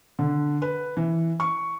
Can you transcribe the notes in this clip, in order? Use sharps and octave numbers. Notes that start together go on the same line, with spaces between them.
D3
B4
E3
C#6